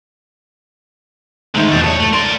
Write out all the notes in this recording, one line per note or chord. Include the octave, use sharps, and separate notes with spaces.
G#2 D3 D#3 A3
E2 B2 C5 D5
G2 C#5 A5
A3
A#4 D5 C6